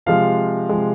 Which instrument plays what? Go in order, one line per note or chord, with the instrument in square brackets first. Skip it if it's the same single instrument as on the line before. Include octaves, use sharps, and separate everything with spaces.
[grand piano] C3 F3 G#3 F5
C3 F3 G#3